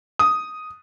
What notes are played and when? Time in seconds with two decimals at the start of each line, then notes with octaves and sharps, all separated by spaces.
0.19 D#6